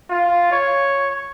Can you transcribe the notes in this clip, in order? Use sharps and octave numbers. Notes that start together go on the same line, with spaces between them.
F4
C#5